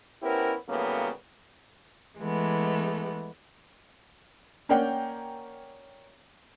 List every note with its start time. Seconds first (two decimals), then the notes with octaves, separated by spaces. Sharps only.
0.23 B3 C#4 E4 G4 A#4 C5
0.69 A2 C#3 F#3 G3 A#3 B3
2.19 E3 G#3 A3 B3
4.69 A#3 C#4 A#4 D5 F#5 G5